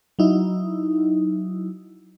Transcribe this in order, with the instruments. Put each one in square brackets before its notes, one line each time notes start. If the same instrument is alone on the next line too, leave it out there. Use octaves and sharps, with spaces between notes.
[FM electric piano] F#3 D#4 E4